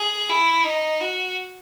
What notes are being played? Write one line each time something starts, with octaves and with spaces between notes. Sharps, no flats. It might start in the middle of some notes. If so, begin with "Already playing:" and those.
Already playing: G#4
E4
D#4
F#4